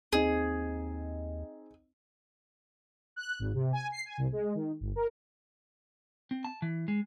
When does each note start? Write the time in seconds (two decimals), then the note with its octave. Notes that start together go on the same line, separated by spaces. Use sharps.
0.13 D#2 C4 D#4 G#4
3.16 F#6
3.39 G#1
3.54 C3
3.73 G#5
3.92 C7
4.06 G#5
4.17 C2
4.32 G#3
4.55 D#3
4.80 G1
4.96 A#4
6.31 C4
6.45 A5
6.62 E3
6.88 G#3